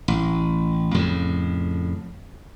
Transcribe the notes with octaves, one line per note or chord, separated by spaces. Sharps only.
A1
F2 A2 C#3